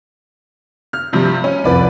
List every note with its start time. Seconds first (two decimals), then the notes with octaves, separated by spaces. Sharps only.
0.93 F6
1.13 G2 C3 F3
1.44 C#4
1.64 C2 F2 B4 D5 B5